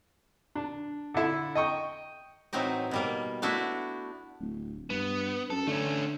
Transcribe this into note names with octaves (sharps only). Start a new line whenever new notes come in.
D4
D3 E4
D#5 G5 C#6
A2 E3 F#3 C4 D#4 D#5
B2 G3 A#3
A3 B3 D4 E4 F#4
D1
G2 B3
F#2 A4
D3 A3 C#4